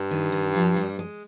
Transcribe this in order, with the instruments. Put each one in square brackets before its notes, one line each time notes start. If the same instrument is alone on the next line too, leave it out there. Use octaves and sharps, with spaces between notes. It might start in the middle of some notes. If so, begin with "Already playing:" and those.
Already playing: [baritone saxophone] G2
[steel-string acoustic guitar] D#3
D#3
F3
G3
G#3